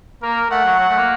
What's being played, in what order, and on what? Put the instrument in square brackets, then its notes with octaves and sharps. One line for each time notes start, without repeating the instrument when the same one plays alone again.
[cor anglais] A#3 [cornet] A#4
[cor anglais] A3 [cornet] F#5
[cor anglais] F#3
F#3
A3
A#3